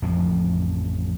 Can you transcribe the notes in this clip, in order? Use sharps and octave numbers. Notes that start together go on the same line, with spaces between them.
A1 F2 A2 F3